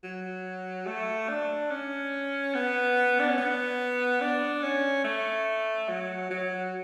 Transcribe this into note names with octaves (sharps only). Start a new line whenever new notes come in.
F#3
A3
D4
C#4
B3
D4
C#4
B3
D4
C#4
A3
F#3
F#3